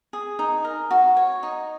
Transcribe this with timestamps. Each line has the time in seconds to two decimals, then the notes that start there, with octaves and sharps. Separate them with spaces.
0.13 G#4
0.39 D#4
0.64 A#4
0.91 F#4
1.17 C#5
1.43 D#4